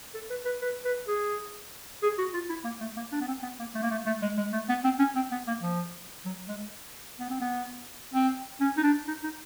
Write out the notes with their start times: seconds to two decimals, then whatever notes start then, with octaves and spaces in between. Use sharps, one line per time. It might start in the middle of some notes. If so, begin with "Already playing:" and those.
0.15 A4
0.30 B4
0.46 B4
0.62 B4
0.85 B4
1.08 G#4
2.03 G#4
2.18 F#4
2.34 F4
2.49 E4
2.65 A#3
2.81 A3
2.97 A#3
3.12 D4
3.21 B3
3.28 C4
3.43 B3
3.60 A#3
3.75 A3
3.83 A#3
3.91 A3
4.06 A3
4.22 G#3
4.38 G#3
4.53 A3
4.69 B3
4.84 C4
5.00 C#4
5.16 C4
5.32 B3
5.48 A#3
5.63 F3
6.26 F#3
6.48 G#3
7.20 B3
7.30 C4
7.41 B3
8.14 C4
8.61 C#4
8.78 D#4
8.83 D4
9.08 D#4
9.24 D#4